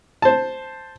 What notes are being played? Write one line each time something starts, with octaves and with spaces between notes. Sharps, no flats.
C5 A5